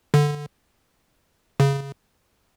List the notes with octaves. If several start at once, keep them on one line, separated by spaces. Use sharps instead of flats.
D3
C#3